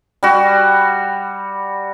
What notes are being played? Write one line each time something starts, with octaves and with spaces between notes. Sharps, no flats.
G3 F#4